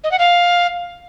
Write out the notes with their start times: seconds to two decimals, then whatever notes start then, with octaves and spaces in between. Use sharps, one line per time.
0.04 D#5
0.11 F#5
0.19 F5